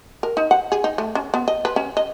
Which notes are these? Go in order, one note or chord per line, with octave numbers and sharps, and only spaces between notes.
A#4
D#4
F#5
G#4
D#4
A3
C#4
B3
D#5
B4
C#4
D#5